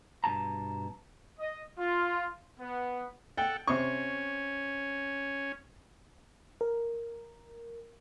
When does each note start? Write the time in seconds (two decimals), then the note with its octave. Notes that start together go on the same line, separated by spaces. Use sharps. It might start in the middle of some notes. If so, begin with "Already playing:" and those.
0.24 G2 B2 A5 A#5
1.40 D#5
1.78 F4
2.60 B3
3.37 A4 F#5 G5
3.67 C3 C#4 C5 C#6
6.61 A#4